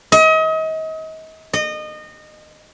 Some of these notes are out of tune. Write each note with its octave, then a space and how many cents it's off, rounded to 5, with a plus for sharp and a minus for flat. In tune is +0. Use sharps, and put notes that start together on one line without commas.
D#5 +35
D#5 -25